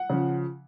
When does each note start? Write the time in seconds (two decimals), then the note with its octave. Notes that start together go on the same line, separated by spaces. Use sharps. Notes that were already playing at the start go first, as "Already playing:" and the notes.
Already playing: F#5
0.10 C#3 F3